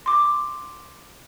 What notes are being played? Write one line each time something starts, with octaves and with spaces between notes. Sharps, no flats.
C6 D6